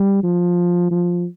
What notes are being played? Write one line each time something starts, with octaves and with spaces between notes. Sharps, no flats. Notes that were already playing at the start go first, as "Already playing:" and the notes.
Already playing: G3
F3
F3